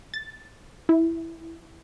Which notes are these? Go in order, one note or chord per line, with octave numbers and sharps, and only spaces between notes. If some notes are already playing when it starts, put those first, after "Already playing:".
A6
E4